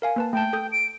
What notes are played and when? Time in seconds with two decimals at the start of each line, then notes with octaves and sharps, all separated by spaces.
0.02 A#4 F5 G#5
0.16 A#3 B4 A5
0.33 A3 G5 A5
0.53 A4 D#6 G6
0.72 D7